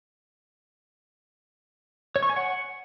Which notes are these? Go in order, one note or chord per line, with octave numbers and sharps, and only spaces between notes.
C#5
C#6
G#5
F#5